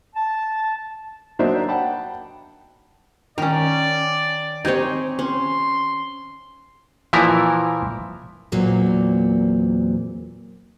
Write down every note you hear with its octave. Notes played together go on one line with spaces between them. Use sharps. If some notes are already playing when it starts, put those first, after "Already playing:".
A5
F#3 A#3 D4 D#4 C5 E5
F#5 G5 A5 B5
D#3 C#4 A#4 D5
C4 D#4 G4 C#5 G#5
C#4 C6
A#2 E3 F3 E4 A#4
E2 A#2 F#3 A#3 C4